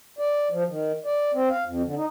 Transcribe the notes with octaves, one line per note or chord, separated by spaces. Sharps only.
D5
F3
D#3
D5
C4
F5
F2
D3
D#4